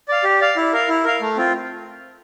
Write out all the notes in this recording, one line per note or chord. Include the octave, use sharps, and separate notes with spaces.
D5 F5
G4
D5 F5
E4
A#4 F5
E4
A#4 F5
A3
C4 F4